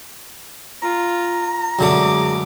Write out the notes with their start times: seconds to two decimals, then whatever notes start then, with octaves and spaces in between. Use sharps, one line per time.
0.82 F4 A#5
1.79 F#2 D3 G#3 A3 D6